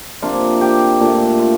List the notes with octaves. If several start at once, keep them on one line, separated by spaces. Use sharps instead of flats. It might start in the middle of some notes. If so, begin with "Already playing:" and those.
C3 F3 A#3 D4 F4
G4
A#2 A3 D4
F4